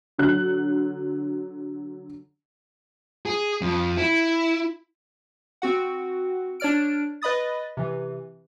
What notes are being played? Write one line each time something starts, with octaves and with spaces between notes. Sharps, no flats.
D3 F#3 F#6
G#4
F2
E4
C4 F#4 F#5
D4 C#5 D5 F6 D7
B4 D#5 B5 D#6 A6
C3 E3